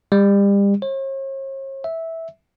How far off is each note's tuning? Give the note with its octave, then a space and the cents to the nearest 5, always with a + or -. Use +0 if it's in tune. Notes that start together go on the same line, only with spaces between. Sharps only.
G3 +35
C#5 -45
E5 -10